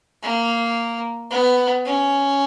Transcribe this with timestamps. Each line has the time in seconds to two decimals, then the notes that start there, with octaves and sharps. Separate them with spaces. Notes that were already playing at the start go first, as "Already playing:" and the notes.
0.23 A#3
1.31 B3
1.85 C#4